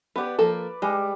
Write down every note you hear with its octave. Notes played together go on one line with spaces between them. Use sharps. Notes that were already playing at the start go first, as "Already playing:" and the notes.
B3 G4 B4 D5
F3 A#3 A4
G3 G#3